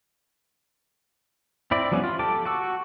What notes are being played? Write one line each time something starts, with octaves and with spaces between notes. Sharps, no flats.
C4 E4 D5
F3 G3 B3 C#4
F4
G4 A4 D6
F#4 C#6 E6